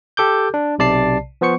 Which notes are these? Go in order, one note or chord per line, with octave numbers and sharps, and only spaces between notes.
G4 A4 D6 G6
D4
B1 C3 D5 A5 C7
F3 B3 C5 C#6 C#7